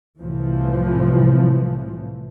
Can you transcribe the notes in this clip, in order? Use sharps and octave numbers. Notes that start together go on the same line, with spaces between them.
C2 A2 E3 F3